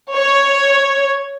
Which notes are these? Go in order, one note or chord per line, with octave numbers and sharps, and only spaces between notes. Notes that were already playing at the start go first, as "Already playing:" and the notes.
C#5